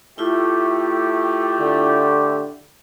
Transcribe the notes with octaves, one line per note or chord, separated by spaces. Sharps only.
A2 A3 E4 F4 G4
D3